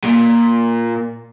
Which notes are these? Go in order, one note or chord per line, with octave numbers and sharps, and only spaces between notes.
A#2